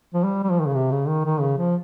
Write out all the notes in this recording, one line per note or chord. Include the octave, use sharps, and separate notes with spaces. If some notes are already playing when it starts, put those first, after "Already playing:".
F3
G3
G3
F3
D#3
C#3
C3
C#3
D#3
D#3
C#3
F3